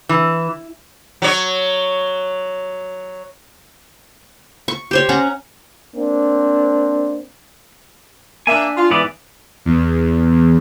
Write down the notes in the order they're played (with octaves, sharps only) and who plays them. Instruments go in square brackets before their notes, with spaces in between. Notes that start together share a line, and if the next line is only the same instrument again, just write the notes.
[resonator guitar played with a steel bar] E3
[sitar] F#3 C#5
[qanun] C#6
G4 C5 C#5
C#4 F#5 A#5
[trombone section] A#3 C4 D4
[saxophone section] A#3 E5 [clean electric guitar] D4 G#5
[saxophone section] F4
[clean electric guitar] G#2 B3 D5 [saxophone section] E3
[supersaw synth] E2